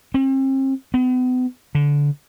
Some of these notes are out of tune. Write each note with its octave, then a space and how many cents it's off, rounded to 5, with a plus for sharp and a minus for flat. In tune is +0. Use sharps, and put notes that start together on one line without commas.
C4 +40
B3 +40
D3 -20